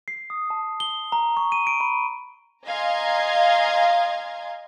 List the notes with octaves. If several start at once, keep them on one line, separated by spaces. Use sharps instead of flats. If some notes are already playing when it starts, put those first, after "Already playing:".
C7
D#6
A5
G7
A#5
C#6
D#7
D7
B5
D#5 F5 G#5 A#5 C6 G#6